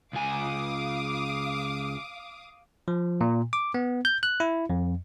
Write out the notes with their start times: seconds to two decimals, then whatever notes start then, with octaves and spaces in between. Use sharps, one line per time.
0.13 C#2 F5 G#5 D6 D#6
2.88 F3
3.21 A#2
3.53 D6
3.74 B3
4.05 G6
4.23 F#6
4.40 E4
4.70 F2